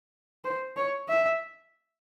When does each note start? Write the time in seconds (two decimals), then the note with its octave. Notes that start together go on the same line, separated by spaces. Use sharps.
0.45 C5
0.77 C#5
1.08 E5